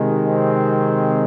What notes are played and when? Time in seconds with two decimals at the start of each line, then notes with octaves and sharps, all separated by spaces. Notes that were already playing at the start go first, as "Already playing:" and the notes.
Already playing: C3 D#3 G#3
0.26 C4